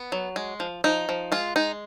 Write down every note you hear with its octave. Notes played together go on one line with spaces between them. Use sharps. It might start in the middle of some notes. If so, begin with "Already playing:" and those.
Already playing: B3
F#3
G#3
F3
F3 D#4
F3
G#3 F4
G#3 D#4